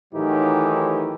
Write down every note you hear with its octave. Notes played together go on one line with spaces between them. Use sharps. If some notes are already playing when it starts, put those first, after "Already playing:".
A2 D#3 E3 F#3 D#4 G4